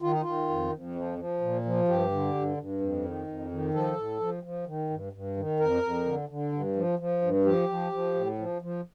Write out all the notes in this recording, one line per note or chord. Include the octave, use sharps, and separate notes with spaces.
D#3 F4
D#4
D#3 F4
F2
F2
F3
F3
A#2
F3
G2 G4
D3
G2
G2
F2
D#3
F2
D#3
F3 A4
A2
F3
F3
D#3
G2
G2
D#3
F2 A#4
F2
D3
D3
G2
F3
F3
G2
F3 G4
F3
F3
A2
F3
F3